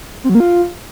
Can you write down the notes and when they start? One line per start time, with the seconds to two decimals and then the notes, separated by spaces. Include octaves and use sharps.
0.24 C4
0.29 F#3
0.35 A#3
0.40 F4